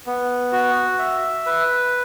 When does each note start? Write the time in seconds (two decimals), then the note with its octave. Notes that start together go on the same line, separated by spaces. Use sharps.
0.06 B3
0.52 F#4
0.99 E5
1.46 B4